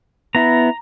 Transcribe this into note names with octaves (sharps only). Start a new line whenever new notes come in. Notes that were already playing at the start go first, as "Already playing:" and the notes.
B3 E4 A#5